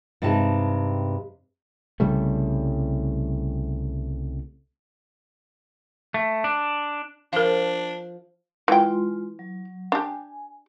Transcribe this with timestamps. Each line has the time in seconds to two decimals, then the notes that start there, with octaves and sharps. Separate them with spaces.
0.22 G2 C3 G#3 D#4 A5
2.00 C2 C#3 G3 A3
6.14 A3
6.44 D4
7.33 F3 D4 A#4 F5
8.68 E3 G#3 F4 G5 C6
9.39 F#3
9.92 D4 G4 G#5